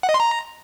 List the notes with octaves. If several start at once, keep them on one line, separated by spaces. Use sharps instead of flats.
F#5
D#5
C6
A#5